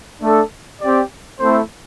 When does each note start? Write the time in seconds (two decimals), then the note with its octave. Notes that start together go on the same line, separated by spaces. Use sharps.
0.21 A3 D4 A4
0.81 C4 G4 D5
1.39 A3 C4 E4 A4 C5